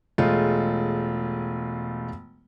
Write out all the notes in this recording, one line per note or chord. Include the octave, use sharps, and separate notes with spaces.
E1 G#3 A3 F4